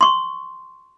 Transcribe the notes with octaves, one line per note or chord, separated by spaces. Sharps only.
C6 C#6